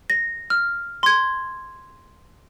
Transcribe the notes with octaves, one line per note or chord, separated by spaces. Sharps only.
A#6
F6
C6 G#6